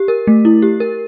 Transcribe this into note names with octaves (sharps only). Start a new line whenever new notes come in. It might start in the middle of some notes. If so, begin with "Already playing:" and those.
Already playing: G4
A#4
A3
E4
G4
A#4